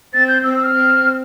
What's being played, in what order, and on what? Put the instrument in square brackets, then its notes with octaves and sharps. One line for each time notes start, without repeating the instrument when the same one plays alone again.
[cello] C4 [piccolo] A6
[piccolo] G6
[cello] C4 [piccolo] E6
[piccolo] E6
F6
[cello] C4